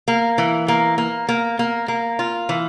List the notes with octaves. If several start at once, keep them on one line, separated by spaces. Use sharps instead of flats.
A#3
E3
A#3
A#3
A#3
A#3
A#3
F4
E3